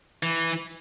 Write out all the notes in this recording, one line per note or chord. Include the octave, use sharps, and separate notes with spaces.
E3